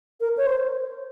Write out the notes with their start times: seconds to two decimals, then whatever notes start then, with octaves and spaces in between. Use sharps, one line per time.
0.21 A#4
0.37 C#5
0.46 C5